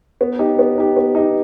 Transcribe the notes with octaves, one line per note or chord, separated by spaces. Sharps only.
B3
D#4 G4
B3
D#4 G4
B3
D#4 G4